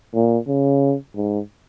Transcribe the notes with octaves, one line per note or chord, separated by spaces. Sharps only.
A#2
C#3
G#2